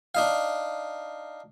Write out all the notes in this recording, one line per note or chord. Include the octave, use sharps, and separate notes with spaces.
D4 D#4 F5